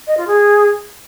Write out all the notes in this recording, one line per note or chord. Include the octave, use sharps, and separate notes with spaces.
D#5
F4
G#4